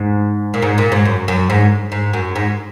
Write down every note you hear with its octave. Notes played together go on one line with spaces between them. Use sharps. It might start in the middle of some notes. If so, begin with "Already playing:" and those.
Already playing: G#2
A#2
G#2
A#2
G#2
F#2
F#2
G#2
G#2
F#2
G#2